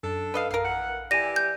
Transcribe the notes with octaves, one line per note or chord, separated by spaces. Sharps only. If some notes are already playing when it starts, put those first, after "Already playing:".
F#2 D4 A4
B4 D#5 F5
A#1 A#4 F5
E3 F#5
E3 E4 G4 D5 G#5 A#6 D#7
G6